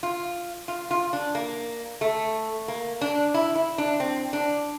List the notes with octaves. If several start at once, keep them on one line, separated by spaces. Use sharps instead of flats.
F4
F4
F4
D4
A#3
A3
A#3
D4
E4
E4
D4
C4
D4